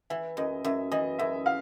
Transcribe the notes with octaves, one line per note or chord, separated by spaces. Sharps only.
E3 E5
F#2 D#5
F#2 E5
E3 D#5
F#2 E5
F5